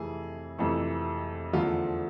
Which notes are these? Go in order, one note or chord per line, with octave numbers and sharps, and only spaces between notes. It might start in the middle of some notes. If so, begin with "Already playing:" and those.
Already playing: F2 C3 E3 A3 G#4
F2 C3 E3 A3
E2 D3 F3 A3 F4